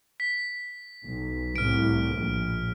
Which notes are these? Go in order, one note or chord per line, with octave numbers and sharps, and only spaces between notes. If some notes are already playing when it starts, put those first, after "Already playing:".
B6
B1
C2 A2 F6 D7
A#1